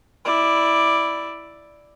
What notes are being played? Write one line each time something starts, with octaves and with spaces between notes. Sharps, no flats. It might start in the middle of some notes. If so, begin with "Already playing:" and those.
E4 D5